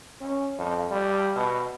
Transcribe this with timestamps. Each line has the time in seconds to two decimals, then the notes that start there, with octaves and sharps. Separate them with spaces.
0.21 C#4
0.58 F2
0.90 G3
1.36 B2